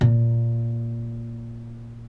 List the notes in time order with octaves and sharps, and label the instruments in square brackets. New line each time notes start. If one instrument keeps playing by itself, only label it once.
[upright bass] A#2